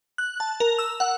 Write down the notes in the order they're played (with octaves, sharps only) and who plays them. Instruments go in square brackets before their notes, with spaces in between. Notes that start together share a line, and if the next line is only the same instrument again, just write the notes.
[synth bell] F#6
A5
A#4
E6
F#5